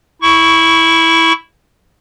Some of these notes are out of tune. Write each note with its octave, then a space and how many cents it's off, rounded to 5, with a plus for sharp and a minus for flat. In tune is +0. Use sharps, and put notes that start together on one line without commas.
E4 -5 C#6 +5